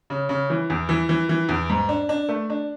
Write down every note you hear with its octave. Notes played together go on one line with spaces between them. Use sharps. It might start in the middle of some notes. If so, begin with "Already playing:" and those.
C#3
C#3
E3
E2
E3
E3
E3
E2
G#2
D4
D4
A3
D4